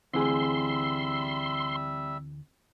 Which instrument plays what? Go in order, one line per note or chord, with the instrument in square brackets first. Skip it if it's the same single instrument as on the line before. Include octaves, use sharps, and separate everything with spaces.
[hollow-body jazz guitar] D2 E3 G#4 [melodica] G3 E5 E6 [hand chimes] C4 [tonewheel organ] C6